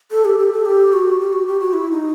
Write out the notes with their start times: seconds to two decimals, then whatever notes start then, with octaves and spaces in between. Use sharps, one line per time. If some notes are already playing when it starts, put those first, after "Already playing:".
0.11 A4
0.25 G4
0.39 G4
0.52 A4
0.65 G4
0.93 F#4
1.19 G4
1.33 F#4
1.47 G4
1.60 F#4
1.73 E4
1.91 D#4